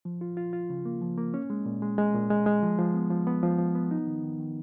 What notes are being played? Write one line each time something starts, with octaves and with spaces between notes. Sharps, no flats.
F3
F4
F4
F4
C#3
A#3
F3
A#3
C#4
G#3
A#2
G#3
G#3
A#2
G#3
G#3
F3
F3
B3
F3
B3
F3
F3
B3
D#4
D#3
D#3
D#3